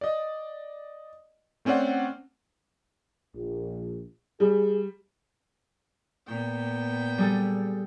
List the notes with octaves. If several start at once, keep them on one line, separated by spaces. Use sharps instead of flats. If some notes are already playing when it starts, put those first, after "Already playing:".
D5 D#5
A3 C4 C#4 C5 D5 F#5
A#1
G3 G#4
A#2 B3 G5
G3 G#4 A4